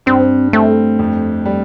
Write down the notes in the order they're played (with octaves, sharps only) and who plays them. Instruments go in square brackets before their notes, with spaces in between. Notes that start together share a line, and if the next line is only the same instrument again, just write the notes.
[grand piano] G2 [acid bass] C4
[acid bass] A3 [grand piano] C4
[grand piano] F2
G3